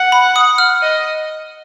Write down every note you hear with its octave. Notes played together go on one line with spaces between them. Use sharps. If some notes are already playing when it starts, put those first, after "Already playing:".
Already playing: F#5
B5
D#6
F6
D#5